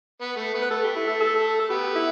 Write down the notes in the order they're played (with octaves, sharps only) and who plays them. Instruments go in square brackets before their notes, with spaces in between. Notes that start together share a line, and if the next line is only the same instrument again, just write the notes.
[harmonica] B3
A3
B3
[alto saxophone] B4
[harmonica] A3 [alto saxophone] A4
[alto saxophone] G4
E4
A4
A4
A4
[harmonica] B3 [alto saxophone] G4
[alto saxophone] E4